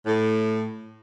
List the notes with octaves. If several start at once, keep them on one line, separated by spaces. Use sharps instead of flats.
A2